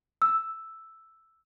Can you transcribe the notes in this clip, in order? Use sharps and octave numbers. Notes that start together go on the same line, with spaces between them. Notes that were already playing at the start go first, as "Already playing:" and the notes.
E6